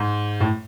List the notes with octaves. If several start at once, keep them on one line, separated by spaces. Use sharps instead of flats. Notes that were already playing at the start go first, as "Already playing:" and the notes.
Already playing: G#2
A2